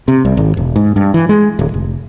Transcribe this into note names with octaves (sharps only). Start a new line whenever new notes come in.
C3
C2
G#1
E1
G#2
G2
E3
G#3
D1
F1